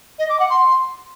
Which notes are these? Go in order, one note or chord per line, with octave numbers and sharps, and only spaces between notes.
D#5
D6
F#5
C6